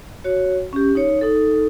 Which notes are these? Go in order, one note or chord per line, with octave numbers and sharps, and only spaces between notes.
F#4 C#5
C#4 G4
D#4 C#5
D#4 A4